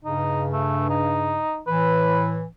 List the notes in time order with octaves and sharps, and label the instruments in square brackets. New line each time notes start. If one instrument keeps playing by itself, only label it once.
[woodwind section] G2 C#3 [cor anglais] D#4
[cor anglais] A3
D#4
[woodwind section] A2 E3 [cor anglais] B4